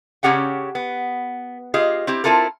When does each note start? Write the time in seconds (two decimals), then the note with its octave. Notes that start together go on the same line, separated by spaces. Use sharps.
0.23 C#3 C#4 G4 F#5 G5
0.75 B3
1.74 F4 G4 G#4 D#5
2.07 C4 E4 G4
2.24 C4 E4 F4 A4 A#4